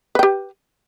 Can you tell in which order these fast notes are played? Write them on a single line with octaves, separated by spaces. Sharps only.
B4 G5 G4